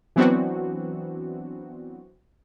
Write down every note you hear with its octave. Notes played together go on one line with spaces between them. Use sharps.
E3 F#3 B3 C4 D4 F#4